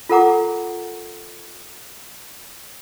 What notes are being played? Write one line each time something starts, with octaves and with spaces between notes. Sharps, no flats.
F4 A4 A#4 F#5 A#5 D6